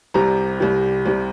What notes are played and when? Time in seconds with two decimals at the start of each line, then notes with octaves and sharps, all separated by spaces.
0.14 C2 C3 G3 A#5
0.60 C2 C3 G3
1.05 C2 C3 G3